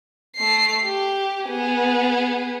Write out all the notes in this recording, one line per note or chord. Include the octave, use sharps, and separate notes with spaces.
A3 C7
G4
B3 G#4